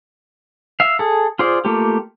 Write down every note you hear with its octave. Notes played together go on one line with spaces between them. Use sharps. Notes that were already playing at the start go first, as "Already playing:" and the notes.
E5 F5
G#4 A4
F4 G#4 C5 D5
A3 A#3 F4 G4